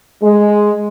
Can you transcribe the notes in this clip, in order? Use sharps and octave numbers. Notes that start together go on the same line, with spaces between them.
G#3